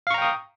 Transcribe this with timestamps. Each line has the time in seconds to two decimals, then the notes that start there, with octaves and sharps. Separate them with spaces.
0.07 F5
0.11 C#6
0.14 A#5
0.18 G5
0.22 D#6